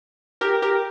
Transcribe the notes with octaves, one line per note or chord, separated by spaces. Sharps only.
G4 A#4
G4 A#4